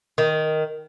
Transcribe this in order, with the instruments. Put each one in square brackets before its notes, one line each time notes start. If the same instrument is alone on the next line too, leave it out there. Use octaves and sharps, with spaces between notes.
[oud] D#3